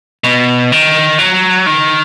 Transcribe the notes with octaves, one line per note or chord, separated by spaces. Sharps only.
B2
D#3
F#3
D#3